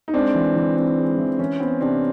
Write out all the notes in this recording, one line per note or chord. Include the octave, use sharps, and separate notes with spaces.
D#4
G#3 C4 D4
E3
E3
C4
G#3
E3
E3 C#4
B3 C4
C3 C4 D4